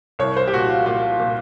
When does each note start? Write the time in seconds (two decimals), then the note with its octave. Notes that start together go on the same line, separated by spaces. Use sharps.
0.19 C2 C#5
0.37 C5
0.48 G4
0.53 A#2 F#4
0.70 F4
0.86 A#2 F4
1.20 A#2